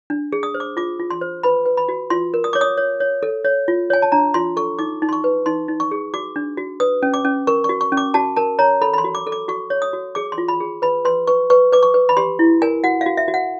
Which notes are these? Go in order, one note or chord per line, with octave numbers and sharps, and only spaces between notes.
D4
G#4
D#6
C5
D6
F4 D6
F4
C6
C5
B4 B5
B4
B5
F#4
F4 C6
A#4
D#6
C#5 D6
D#6
C#5
C#5
A4
C#5
F4
C#5 G#5
A5
D4 A#5
F4 C6
A4 C#6
D#4 D6
D#4
C6
C#6
B4
D#4 C6
D#4
C#6
G#4
F#4 D6
D4
F#4
B4 D#6
C#4
D6
C#4
A#4 C#6
C#6
F#4
C#6
C#4
D6
F#4 A5
A#4 A5
C#5 A#5
A4 B5
B5
C6
F#4
D6
A4
D6
F#4 C#6
C#5
D#6
F#4
G#4 D6
C6
F4
B5
G#4
B4 B5
B4 C6
B4 C#6
B4 C#6
B4 D6
C#6
B4
B5
G4 C6
E4
A#4 G#5
F#4 F#5
F5
F#4
E5
F#4
F#5